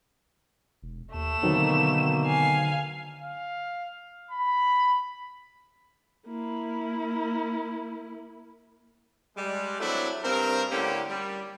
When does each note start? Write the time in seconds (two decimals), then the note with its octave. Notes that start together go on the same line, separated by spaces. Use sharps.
0.83 E1
1.14 D#2 A3 E7
1.43 B2 D3 D#3 F#3 A#3 C4 D#4
2.26 F5 G#5
3.22 F5
4.31 B5
6.27 A#3 E4
9.37 G3 G#3
9.80 E3 F#3 A3 C4 D4 E4
10.24 G2 C4 A#4
10.71 A2 D3 A#3 C#4 G4
11.09 G3